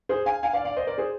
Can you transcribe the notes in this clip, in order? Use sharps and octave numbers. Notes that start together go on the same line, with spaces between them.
G#4 C5
F5 G#5
F5 G#5
D5 F5
D5 F5
C5 D#5
A#4 D5
G#4 C5